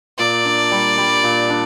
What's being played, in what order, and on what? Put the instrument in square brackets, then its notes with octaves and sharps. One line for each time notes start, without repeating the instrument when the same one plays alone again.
[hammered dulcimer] A#2 [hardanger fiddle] D5
[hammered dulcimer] D4
G3
G3
A#2
D4